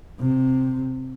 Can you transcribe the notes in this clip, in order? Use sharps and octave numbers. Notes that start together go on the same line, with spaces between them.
C3